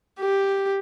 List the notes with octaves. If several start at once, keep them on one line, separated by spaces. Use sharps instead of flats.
G4